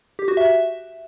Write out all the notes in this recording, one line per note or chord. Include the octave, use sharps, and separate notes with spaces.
G4
F#4
E5